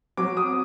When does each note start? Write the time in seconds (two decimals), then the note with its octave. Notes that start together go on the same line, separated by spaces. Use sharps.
0.17 F#3 D6
0.37 D#6